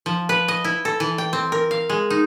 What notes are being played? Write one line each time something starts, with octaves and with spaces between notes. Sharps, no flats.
F3
B4
D#5
E4
A4
E3
G5
C4
A#4
F5
G#3
D#4